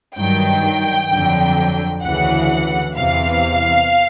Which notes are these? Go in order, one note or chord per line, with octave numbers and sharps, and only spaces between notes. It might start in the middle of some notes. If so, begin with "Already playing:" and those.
G2 D#3 F#3 G5
F2 D3 F#3
D2 C#3 E3 F#5
E2 C3 E3 F5